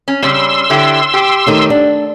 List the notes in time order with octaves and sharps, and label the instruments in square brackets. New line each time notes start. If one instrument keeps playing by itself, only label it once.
[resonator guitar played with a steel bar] C#4
[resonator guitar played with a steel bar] C#3 G3 [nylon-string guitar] C#4 [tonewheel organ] C6 E6
[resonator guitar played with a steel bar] D3 E4 G4
G4
[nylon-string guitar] D#3 A3 C#4
D4